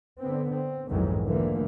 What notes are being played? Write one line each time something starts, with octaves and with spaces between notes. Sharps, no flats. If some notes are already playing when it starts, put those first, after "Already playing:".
D3 B3 C4
C4
B1 F2 G#2 D#3 E3 F#3
D3 E3 F3 A3 A#3